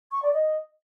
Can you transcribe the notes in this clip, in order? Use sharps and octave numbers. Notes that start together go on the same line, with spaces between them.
C#6
D5
D#5